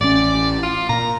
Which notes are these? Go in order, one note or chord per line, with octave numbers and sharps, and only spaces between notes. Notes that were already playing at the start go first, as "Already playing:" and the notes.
A1 C#4 D5
F4
A#2 A#5